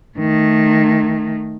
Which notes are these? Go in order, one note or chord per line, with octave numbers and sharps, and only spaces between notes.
D#3 A3